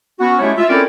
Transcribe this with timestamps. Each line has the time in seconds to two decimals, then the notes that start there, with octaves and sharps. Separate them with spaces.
0.20 B3 C#4 F#4
0.40 G#3 A3 C#4 E4 G4 C#5
0.57 F4 E5
0.69 C4 C#4 E4 A4 A#4 D5